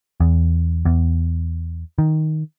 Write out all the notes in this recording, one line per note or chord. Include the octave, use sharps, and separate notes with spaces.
E2
E2
D#3